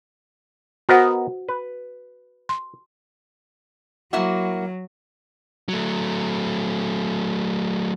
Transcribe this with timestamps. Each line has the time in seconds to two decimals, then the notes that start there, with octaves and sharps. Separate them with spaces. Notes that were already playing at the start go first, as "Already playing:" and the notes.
0.89 B3 F#4 A#4 C5 D#5 F#5
1.49 B4
2.49 C6
4.13 F#3 A#3 E4 F#4
5.69 F#3 A3